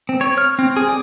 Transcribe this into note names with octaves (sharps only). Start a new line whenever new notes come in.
C4
C#5
F6
C4
G#4
D5